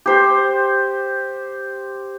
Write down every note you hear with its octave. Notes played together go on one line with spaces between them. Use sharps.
G4 C5